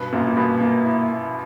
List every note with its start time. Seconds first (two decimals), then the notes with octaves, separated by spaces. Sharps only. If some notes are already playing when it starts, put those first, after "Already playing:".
Already playing: G2 B2 B4
0.12 F#2 A#2 A#3
0.27 A#2
0.36 G2 B2 B4
0.61 A#3
0.85 E4